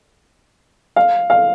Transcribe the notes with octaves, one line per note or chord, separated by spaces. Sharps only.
F5
F5